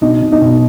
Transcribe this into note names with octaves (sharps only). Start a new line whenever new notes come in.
B2 D#4
B2
D#4
B2